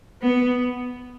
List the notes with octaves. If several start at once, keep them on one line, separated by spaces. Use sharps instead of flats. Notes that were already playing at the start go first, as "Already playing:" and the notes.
B3